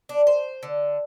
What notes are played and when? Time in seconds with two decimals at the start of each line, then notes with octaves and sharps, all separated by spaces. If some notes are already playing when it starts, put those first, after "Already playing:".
0.09 D4
0.27 C5
0.63 D3